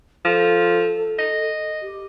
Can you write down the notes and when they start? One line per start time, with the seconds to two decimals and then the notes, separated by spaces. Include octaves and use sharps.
0.25 F3 A4
1.19 D#5
1.82 G4